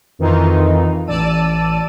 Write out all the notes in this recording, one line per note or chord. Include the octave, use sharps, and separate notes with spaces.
F2 D#3 E3 D#4 F4
A1 D5 A5 E6 D#7